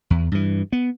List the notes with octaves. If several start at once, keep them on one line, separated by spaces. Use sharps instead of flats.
E2
G2 E3
B3